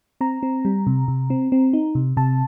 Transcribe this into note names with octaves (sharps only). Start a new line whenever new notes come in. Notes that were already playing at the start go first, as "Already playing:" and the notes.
C4 A#5
C4
G3
C3
C3
C4
C4
D#4
C3
C3 A5